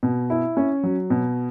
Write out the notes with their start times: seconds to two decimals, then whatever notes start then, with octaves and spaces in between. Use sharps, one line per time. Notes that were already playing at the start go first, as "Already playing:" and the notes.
0.03 B2
0.30 E4
0.57 C#4
0.84 F#3
1.10 B2